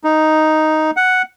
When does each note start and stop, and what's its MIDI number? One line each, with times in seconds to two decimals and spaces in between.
0.04 0.91 63
0.97 1.22 78